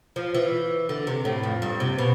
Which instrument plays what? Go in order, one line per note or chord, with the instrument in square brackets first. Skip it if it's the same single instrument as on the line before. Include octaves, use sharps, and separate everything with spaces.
[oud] F3
E3
D3
C3
A2
F2
G2
C3
B2